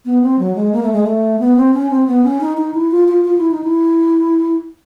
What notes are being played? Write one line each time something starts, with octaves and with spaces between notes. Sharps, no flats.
B3
C4
F#3
G#3
A#3
A3
G#3
A3
B3
C4
C#4
C4
B3
C#4
D#4
D#4
E4
F4
F4
F4
E4
D#4
E4